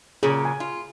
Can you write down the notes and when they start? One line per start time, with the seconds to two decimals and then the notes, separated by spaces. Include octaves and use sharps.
0.23 A#2 C#3 F#3 G#4
0.45 G#5
0.60 F4